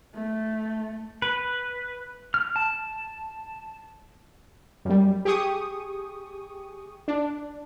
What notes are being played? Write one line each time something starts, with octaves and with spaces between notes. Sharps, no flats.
A3
B4
F6
A5
F#2 G3
G4 G#4 C#6 D#6
D4